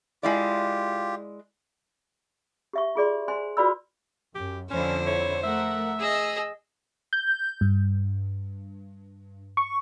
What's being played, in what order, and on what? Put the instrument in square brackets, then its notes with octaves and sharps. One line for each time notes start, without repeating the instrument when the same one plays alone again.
[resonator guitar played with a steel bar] G#3 E4 D5 [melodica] F4 G4
[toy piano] G4 E5 C#6
F4 G#4 D5 C6
C5 G#5 C6
F4 F#4 B4 D5 B5 E6
[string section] F#2 [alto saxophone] G4
[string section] F2 D3 E4 [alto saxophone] C#4 [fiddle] C5
[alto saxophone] C#5
[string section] A3 A#4 F#5 [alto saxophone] E5
[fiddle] G#4 D#5 [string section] E6
[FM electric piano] G6
G2
C#6